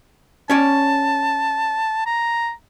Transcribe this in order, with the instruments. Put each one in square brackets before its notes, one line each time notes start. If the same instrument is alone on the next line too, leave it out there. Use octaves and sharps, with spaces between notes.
[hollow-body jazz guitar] C#4 C#5 D5 [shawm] A5
[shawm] A#5